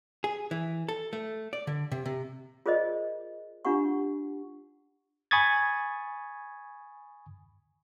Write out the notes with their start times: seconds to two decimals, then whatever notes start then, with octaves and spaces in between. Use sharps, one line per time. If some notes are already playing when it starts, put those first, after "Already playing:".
0.24 G#4
0.51 E3
0.89 A4
1.13 A3
1.53 D5
1.67 D3
1.92 C3
2.06 C3
2.66 F4 G#4 A#4 C5 D5 D#5
3.65 D4 F4 G4 F#5 C#6
5.31 G#5 B5 C#6 D#6 G#6 A6